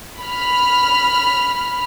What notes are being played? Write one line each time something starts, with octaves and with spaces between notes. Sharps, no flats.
B5 F6